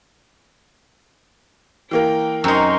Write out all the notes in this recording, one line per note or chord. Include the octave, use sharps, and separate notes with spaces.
E3 A#3 A#4 G5
F#2 C4 D#4 A#4 C6 C#6